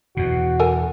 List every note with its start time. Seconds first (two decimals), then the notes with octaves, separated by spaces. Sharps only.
0.17 E2 B2 F#4
0.60 A4 A#4 G#5